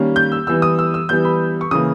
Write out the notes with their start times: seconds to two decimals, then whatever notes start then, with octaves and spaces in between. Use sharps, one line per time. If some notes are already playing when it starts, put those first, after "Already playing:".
Already playing: D#3 G3 A#3 C#4
0.16 G6
0.32 E6
0.47 E3 G3 B3 E6
0.62 D#6
0.79 E6
0.94 E6
1.09 E3 G3 B3 G6
1.25 B5
1.61 C#6
1.71 C#3 E3 A#3 D#6